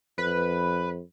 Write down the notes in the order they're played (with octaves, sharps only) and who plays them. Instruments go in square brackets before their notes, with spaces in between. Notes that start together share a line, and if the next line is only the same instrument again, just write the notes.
[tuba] F2 [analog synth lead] B4